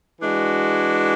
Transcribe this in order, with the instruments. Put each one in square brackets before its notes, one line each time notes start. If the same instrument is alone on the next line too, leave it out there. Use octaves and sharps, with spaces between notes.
[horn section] E3 G#3 D4 F#4